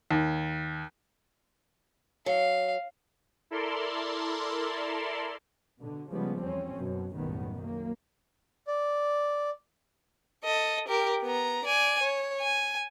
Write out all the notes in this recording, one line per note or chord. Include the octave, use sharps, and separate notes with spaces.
D#2
F#3 F5
E4 A4 A#4 D5 C6
B2 D3
C#3 F3 G3 G#3 B3
E2 C4 C#4
F#1 F#2 B2
F#1 B1 A2 D#3 G3 B3
F#2 A#3
D5
A4 D#5
G4 A#4
B3 A#5
D5 G#5
C#5
G#5